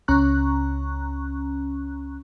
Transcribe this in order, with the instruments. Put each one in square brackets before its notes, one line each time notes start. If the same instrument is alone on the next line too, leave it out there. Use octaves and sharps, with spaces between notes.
[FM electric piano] C#2 C#4 A#5 C#6 F#6